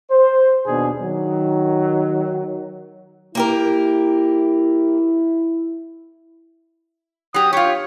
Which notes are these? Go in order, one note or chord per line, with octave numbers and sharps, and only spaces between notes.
C5
D#2 B2 D4 G#4
D#3 F#3
A#3 E4 G4 A#4
F#3 G4 D#6
F4 G4 C#5